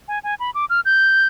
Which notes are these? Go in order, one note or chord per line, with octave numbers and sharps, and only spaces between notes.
G#5
G#5
B5
D6
F6
G6